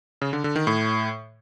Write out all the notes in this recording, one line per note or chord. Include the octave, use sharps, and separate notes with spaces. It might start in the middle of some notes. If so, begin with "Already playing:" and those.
C#3
D3
D3
D#3
A2